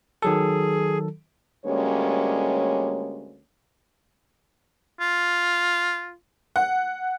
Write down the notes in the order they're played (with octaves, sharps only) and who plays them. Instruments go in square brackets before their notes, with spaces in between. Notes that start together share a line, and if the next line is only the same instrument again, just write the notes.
[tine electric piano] D#3 F#3 A4 [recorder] G#4
[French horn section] D2 G3 G#3 A#3 C#4 C#5
[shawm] F4
[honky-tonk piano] F#5